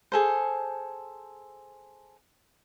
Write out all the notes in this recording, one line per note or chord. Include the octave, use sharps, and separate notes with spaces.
G#4 A4 C5